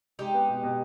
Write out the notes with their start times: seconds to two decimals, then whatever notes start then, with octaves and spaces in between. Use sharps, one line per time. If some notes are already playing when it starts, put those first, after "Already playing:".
0.19 G#3 D#4 G4
0.34 B3
0.49 B2
0.63 B2